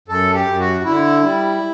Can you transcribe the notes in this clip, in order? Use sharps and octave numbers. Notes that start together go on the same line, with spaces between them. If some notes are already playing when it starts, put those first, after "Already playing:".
F#2 A4
G4
F#2
F#4
D3 E4
G3